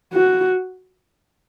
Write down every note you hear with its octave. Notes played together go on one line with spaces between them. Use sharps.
F#4